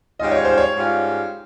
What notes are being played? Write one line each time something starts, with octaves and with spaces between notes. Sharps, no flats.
G#2 G3 C#4 F4 D#5
C#5
C5
C#5
G#2 G3 C#4 F4